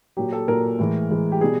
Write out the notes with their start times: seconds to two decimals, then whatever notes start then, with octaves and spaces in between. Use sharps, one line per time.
0.17 A#2 F#3 G4
0.33 A4
0.48 A#2 F#3 A#4
0.79 A2 E3 G#3
1.10 A2 E3 G#3
1.32 G4
1.41 B2 G3 G#4